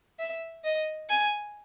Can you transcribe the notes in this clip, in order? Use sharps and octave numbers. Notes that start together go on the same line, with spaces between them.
E5
D#5
G#5